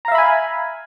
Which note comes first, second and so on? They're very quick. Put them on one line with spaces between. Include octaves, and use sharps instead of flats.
A#5 F5 E5 B5 G#5